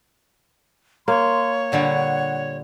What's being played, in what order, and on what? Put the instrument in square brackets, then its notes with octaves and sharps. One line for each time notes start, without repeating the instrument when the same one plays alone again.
[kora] A#3 [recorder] C#5 [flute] C6
[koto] A#2 D3 G3 [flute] F#5